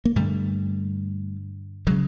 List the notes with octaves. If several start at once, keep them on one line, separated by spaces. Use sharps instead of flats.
A#3
G2 D3 G3 A3
C#3 F#3 G#3